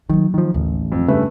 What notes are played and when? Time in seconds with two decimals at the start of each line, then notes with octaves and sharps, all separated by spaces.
0.09 D#3 F#3 A#3
0.34 D#3 F3
0.54 A1 D#2 D3
0.92 F2
1.08 G2 C#3 A3 B4 E5